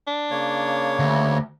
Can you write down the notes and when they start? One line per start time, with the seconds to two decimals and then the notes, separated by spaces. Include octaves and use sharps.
0.07 D4
0.31 C#3 A#3 C#5
0.99 D2